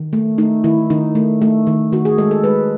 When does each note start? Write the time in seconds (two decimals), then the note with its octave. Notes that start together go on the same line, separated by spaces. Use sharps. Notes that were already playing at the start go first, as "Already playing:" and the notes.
Already playing: D#3
0.13 A3
0.38 A3 D#4
0.64 D#3 E4
0.90 D#3 D#4
1.15 A3
1.42 A3
1.67 D#3
1.92 D#3 F#4
2.05 G#4
2.18 G#3 A4
2.31 A4
2.44 G#3 B4